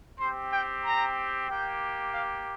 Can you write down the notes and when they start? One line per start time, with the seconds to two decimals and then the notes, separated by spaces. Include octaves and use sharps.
0.20 C4 G4 C5
0.52 G5
0.85 A#5
1.48 A#3 G4 G5
2.13 F5